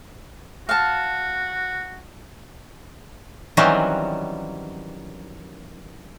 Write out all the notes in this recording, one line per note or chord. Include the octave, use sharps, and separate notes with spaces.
F#4 F5 A5
D#3 E3 F#3 G3 C4 C#4